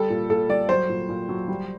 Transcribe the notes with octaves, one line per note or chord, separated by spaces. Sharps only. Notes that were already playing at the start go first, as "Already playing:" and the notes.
Already playing: G3 A4
A#2
A#2 A4
G3 D5
F#3 C5
A#2
A#2
F#3
G3